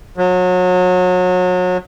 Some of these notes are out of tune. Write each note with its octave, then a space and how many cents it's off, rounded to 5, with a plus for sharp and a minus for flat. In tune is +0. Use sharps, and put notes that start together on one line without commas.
F#3 -30